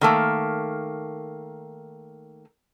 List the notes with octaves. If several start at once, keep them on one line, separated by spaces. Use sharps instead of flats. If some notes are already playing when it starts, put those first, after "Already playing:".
D#3 A3 A#3